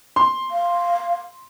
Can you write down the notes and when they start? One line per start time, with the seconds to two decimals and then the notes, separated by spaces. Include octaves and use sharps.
0.16 C6
0.51 F5